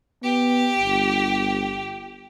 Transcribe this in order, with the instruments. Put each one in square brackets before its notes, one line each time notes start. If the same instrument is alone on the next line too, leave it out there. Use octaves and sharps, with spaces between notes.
[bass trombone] B3 [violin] G4
[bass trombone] G1